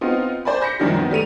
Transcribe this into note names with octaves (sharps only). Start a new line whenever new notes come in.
B3 C4 D#4 F4
C5 D5 G#5 B5
G6 A#6 B6 C#7
F#2 A#2 D#3 F3 G3
D#3 B3
G3 A3 D#7 F7